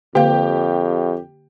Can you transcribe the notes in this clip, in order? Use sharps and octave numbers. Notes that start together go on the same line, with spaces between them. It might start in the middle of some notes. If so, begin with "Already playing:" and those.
F2 D3 A#3 G4 F5